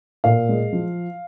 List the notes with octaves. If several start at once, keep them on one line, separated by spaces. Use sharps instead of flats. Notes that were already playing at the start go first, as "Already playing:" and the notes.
A#2 F5
G#3
F3